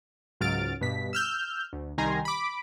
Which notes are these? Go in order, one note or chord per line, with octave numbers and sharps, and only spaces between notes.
C#2 G#2 F#3 F6 A6 D7
G2 B2 B6
E6 F6 G6
D2
C2 D#3 G3 G#5 A#5 C6
B5 D6